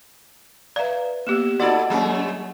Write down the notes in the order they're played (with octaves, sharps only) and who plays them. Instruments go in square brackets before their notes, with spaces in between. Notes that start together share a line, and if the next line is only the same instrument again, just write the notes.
[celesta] B4 E5 F5 [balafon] D5 A#5
[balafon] A#3 B3 G4 [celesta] E6 E7
[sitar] D#4 A4 D5 [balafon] F#4 [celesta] D#5 F#5
[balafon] F#3 A#3 A#5 [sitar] G3 A3 C#4